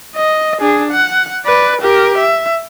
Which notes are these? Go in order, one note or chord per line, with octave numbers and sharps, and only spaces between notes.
D#5
D4 G#4
F#5
B4 D5
G4 A#4
E5